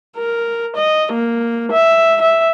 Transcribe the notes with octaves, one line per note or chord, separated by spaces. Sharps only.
A#4
D#5
A#3
E5
E5